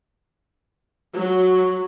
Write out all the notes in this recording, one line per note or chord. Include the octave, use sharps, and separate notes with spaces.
F#3